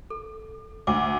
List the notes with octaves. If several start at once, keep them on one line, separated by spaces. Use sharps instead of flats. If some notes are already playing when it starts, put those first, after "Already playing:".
A4
D2 D6